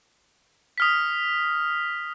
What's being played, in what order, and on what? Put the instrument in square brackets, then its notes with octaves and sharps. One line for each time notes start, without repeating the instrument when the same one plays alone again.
[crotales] D#6 F6 B6